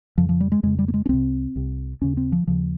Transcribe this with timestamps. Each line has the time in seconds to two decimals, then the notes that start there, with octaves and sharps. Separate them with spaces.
0.18 F2 C#3 F3
0.29 F3
0.40 G3
0.52 G#3
0.63 F2 C#3 G#3
0.79 G3
0.88 A#3
0.94 G#3
1.06 C#4
1.09 C2 C3 C4
1.56 C2 C3
2.01 D#2 C#3 C#4
2.17 C4
2.32 F3
2.47 D#2 C#3 F3